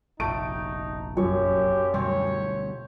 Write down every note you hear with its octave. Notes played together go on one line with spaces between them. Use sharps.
F1 A#1 A3 D#4 D7
F#2 G4 C#5
D2 B2 G3 C4 C#5